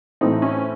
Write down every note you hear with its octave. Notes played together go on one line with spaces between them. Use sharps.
A2 E3 A3 C4 D#4
C#4